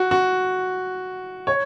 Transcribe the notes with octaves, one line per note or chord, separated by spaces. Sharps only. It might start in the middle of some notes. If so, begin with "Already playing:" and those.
Already playing: F#4
F#4
C#5